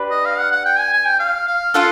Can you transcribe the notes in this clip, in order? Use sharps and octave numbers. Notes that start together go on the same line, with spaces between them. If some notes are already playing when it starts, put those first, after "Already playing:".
Already playing: D4 G4 B4
D#5
F5
F#5
F#5
G5
G#5
G#5
G5
F5
F5
D4 F4 A4 F#5